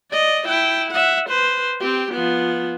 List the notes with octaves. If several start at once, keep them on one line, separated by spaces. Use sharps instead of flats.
D5 D#5
E4 G5
E5 F#5
B4 C5
C4 G4
F3 B3